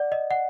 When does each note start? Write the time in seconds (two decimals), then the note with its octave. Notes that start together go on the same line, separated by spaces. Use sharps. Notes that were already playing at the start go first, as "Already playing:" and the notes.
Already playing: D5 F#5
0.12 D#5
0.31 F#5